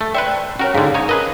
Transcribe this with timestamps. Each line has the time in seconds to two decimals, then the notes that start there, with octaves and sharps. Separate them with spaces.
0.01 A3
0.15 B4 C5 D5 E5 G5
0.59 C#4 F#4 A#4 C#5
0.74 G#2 D3 G4 G#4 F5
0.94 D#4 C#5
1.09 G#4 A#4 B4 D#5